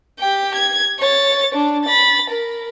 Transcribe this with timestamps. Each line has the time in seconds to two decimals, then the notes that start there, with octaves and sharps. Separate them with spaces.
0.19 G4 G5
0.55 G#6
0.99 C#5 A6
1.54 D4
1.85 B5 A6
2.30 A#4